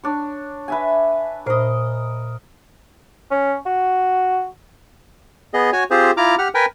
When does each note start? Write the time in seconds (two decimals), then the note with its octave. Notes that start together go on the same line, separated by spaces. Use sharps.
0.04 D4 C#5
0.68 B4 E5 G#5
1.46 A#2 A#4 C5 D#5 B5
3.31 C#4
3.66 F#4
5.54 B3 G#4 D#5
5.73 F#4 C#5 G#5
5.91 C4 F4 G4 G#4 C5
6.17 E4 F4 A#5 D6 F6
6.38 G4 F#5 F6
6.55 A#4 B4 G5 G#5